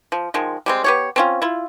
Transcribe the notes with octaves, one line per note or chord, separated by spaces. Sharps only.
F3
D#3 F3 G#3
G3 G#3 C4
B3 G4 C#5
C4 C#4 F4
E4 F4